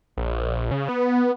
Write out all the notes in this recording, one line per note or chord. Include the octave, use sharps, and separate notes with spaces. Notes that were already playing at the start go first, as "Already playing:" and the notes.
A#1
C#3
B3